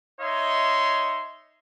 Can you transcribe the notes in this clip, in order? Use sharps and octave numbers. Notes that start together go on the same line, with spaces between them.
D#4 C#5 D#5 E5 C6